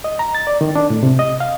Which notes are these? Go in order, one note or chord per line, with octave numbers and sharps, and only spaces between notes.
D#5
A#5
A6
D5
D#3
D4
A2
C3
D#5
F5